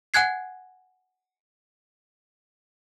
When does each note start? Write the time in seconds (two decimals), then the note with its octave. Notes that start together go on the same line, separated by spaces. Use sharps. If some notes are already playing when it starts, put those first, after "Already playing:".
0.14 F#5 G#5 F#6 G#6 C7